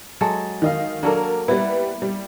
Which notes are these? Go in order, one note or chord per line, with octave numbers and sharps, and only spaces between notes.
F#3 G#3 A4
D#3 D#5 F5
F#3 A#3 D4 A4 A#4
G3 B3 E4
G3